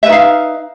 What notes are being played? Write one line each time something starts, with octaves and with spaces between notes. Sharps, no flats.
D#4 B4 E5 F5